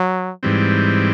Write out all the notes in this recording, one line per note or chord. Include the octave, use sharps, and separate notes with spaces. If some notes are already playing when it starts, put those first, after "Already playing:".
Already playing: F#3
G#2 E3 G3 C4